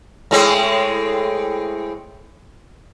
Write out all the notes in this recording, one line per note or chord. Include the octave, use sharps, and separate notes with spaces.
A2 G#3 C4